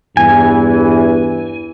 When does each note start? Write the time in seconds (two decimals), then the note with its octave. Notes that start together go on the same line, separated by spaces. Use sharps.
0.17 E2 G2 E3 G#5